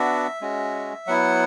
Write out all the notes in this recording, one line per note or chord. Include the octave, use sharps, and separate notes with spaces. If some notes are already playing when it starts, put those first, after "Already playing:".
Already playing: B3 D4 F#4 E5
G#3 C#4 F#4
F#3 B3 E4 F#5